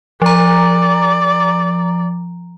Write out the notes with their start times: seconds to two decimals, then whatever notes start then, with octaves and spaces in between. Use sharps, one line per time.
0.22 F3 D5 A#5